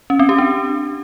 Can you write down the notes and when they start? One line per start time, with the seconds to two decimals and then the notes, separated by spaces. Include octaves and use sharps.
0.10 C#4
0.19 C4
0.29 G4
0.38 D4